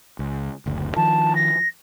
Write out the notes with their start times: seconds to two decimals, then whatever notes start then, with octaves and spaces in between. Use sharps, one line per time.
0.19 C#2
0.66 F#1 D2
0.96 D#3 F3 A5
1.36 A#6